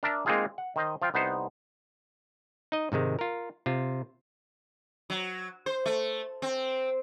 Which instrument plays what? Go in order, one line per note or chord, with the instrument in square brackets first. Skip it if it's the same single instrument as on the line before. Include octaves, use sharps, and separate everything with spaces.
[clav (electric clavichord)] D4 A#4 D5 E5 A5
G#3 A#3 C4 D#4 F4 G#4
F#5
D#3 C5 D#5
F3 F4 F5 G5
C2 B3 D#4 C5
D#4 D#5
G#2 C3 D#3 G#3
F4 A#4
C3 F4
[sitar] F#3
C5
A3
C4